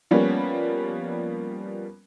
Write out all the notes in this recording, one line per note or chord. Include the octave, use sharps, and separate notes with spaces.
F3 G3 A#3 B3 C#4